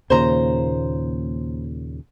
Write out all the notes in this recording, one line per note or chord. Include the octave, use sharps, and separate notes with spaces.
D#2 A#2 C#3 C5 A#5